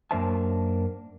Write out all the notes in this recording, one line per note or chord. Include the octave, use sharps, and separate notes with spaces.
F#2 A#3 D4 C5 E5 A5